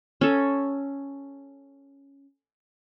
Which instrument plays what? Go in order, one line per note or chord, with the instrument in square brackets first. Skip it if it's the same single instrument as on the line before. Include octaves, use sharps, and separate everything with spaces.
[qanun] C#4 A4